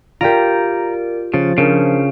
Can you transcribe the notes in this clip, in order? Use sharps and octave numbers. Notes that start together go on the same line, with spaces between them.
F4 G4 A#4 D5 A#5 D7
C#3 F3 A6
C#3 D4 A#4 C5